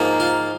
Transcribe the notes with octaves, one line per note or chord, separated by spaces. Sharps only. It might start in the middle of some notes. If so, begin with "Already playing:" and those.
Already playing: G#2 F3 A#3
F4